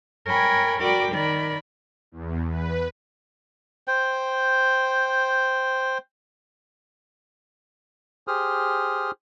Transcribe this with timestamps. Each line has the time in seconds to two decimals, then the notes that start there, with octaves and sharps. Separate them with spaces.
0.25 A#4 C#5 G5 G#5 B5
0.79 F#4 A#4 D5 G5 B5 D6
1.11 D#3 A#4 D5 B5
2.12 E2
2.49 B4
3.88 C5 G5
8.28 G4 G#4 C5 D#6 F6